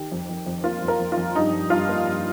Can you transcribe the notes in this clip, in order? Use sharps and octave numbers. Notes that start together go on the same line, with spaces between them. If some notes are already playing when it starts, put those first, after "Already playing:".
Already playing: D#3 G4
F2
F2
F2
A#3 F4
F2
A#4
F2
F4
F2
G2 D#4
G2
G2 F4
A#3
G2